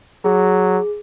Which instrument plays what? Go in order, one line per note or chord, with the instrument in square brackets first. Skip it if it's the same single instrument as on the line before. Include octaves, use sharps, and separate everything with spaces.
[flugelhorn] F#3 [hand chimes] G#4